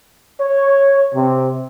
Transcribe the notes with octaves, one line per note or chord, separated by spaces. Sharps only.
C#5
C3